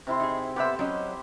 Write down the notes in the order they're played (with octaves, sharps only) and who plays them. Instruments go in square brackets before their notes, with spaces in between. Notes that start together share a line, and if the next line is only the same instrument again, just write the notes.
[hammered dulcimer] C3 E4 C6
[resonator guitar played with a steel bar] D#4 G#4
[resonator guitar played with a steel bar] B3 E5 [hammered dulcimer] G4 B4 C5
[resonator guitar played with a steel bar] F#3 C#4 D#5